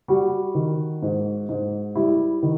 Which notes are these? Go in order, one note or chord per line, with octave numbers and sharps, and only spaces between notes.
G3 F#4
D#3
G#2
G#2
G3 E4
D#3